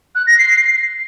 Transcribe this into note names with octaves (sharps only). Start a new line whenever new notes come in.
F#6
A#6
C7